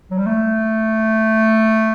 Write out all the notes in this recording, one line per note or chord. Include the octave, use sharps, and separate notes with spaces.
F#3
G3
A3